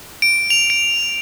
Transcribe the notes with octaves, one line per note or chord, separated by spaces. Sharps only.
D7
F7
D7